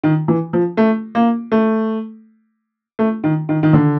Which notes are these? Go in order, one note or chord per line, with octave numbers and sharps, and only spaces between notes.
D#3
E3
F3
A3
A#3
A3
A3
D#3
D#3
D#3
D3